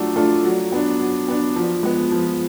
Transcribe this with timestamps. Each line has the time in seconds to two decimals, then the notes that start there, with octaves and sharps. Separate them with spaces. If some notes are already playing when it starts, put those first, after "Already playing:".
Already playing: F#3 A3 D4 F4 A4
0.16 A3 D4 F4 A4
0.44 F#3
0.72 B3 D4
1.00 F#3
1.28 B3 D4
1.56 F3
1.83 G#3 B3
2.12 F3